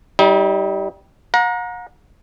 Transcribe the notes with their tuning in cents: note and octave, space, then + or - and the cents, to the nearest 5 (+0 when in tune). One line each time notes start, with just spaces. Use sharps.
G3 -10 D#4 +40
F#5 -40 A#5 +15